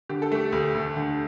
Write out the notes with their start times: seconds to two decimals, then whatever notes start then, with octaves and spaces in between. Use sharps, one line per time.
0.09 D3 G4
0.22 A4
0.32 A3 G4
0.52 D2
0.74 D2
0.96 D3